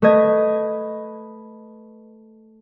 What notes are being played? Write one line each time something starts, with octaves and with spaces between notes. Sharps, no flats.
A3 B4 D#5 G#6